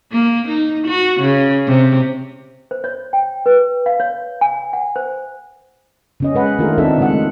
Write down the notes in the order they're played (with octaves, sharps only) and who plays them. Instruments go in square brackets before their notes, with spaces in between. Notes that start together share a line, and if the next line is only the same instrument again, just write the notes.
[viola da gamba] A#3
D#4
F#4
C#3
C3
[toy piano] C5
C#5
G5
B4
F5
C#5
G#5
F#5
C5
[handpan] C#3 C#4 D#5
G#3 B4 F#5
D#3 A3 D4 F4 G#4 A#4
C4 D4 D#4 A4 E5
C#3 G#3 F#5
A3